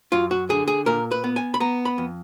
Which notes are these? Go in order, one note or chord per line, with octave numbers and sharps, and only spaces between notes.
F#2 F4
F#4
D3 G#4
G#4
A#2 A#4
B4
B3
G#5
B5
B3 A#5
B5
F2